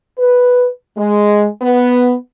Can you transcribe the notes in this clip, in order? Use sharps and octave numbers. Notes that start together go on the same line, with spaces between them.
B4
G#3
B3